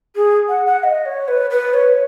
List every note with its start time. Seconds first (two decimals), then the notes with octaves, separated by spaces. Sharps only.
0.16 G#4
0.49 F#5
0.66 F#5
0.84 D#5
1.05 C#5
1.28 B4
1.50 B4
1.74 C#5